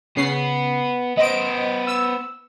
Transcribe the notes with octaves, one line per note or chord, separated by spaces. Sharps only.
C#3 B3 C7
B3 C5 D#5 D7
E6